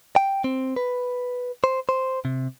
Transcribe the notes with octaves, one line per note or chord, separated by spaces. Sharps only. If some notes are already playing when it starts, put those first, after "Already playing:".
G5
C4
B4
C5
C5
C3